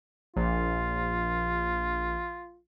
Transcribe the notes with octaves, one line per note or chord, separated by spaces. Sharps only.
A#1 F4